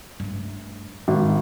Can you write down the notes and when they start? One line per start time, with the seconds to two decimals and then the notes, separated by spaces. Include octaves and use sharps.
0.20 G2 A3
1.08 G#1 A2